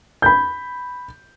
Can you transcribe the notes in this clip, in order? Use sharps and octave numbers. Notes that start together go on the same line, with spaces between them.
B5 G6